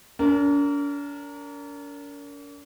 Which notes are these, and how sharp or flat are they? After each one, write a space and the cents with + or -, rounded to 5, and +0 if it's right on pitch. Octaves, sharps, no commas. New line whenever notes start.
D4 -45 A#4 -15